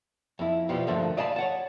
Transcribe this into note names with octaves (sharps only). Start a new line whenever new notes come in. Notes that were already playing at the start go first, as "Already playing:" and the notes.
F2 E4
B2 F3 G3 G4
G2 D3 F3 A3 A#3
D5 D#5 F5 G#5 A5 B5
C#5 F#5 A5